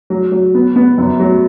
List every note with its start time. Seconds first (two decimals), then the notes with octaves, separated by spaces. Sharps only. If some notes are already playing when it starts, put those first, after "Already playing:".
0.10 F#3
0.32 F#3
0.55 B3
0.76 B3
0.98 F#2
1.20 F#3